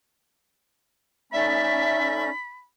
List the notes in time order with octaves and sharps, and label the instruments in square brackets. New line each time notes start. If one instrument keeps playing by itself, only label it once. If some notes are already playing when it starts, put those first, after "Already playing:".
[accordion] A3 C#4 [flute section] D#4 D5 [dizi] E5 [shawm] B5